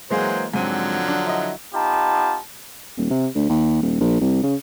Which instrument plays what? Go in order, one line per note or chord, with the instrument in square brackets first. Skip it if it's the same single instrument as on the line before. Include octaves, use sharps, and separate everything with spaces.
[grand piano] E3 G#3 A#3 [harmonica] F#3 G#4 C5
[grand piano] G#2 C4 D#7 [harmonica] D3 F3 F#3
[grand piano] D4
E4 D#5
[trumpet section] B3 D#4 F4 G4 A5
[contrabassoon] D#1
C3
D2
D#2
D#1
A#1
C2
C#3